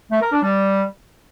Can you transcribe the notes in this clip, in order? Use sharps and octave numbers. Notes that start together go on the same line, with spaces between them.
A3
A#4
D4
G3